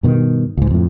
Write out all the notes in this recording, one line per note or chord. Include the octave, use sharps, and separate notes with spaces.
G2 B2 D3 D#3
C#2 G#2
F2 A2